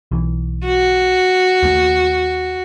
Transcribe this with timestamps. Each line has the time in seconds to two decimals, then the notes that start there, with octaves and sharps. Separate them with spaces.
0.11 B1 E3
0.66 F#4
1.63 D#2 A3